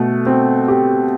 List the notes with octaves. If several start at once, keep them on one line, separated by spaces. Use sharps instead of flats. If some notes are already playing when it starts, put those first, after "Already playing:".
Already playing: B2 A3
C4
G4